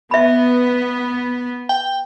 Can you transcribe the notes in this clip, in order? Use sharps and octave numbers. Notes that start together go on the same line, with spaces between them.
B3 E5 B5
G5